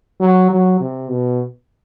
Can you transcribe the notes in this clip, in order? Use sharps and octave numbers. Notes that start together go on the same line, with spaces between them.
F#3
F#3
C3
B2